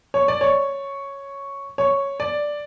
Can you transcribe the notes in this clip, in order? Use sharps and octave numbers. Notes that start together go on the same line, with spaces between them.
C#5
D5
C#5
C#5
D5